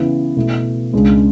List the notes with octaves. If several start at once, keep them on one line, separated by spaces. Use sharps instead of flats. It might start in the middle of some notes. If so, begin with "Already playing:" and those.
Already playing: C#3 E3 B3 E4
B2 A3 E4
C#2 C#3 G#3 D4